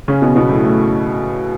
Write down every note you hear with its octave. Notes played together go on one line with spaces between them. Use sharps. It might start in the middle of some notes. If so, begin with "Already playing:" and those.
C#3 C#4
B2 B3
B2 B3
A2 A3
A2 A3